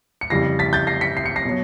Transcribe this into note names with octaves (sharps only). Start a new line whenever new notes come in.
C#7
F2 C#3 E3 G3 A#6 C7
A6 B6
G6 A6
A#6 C7
B6 C#7
C7
C#7
A#6 C7
B2 F#3